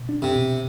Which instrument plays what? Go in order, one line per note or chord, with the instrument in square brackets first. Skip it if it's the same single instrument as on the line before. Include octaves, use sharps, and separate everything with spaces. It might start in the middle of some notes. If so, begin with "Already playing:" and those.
Already playing: [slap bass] B2
D4
[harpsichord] C3
[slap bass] B2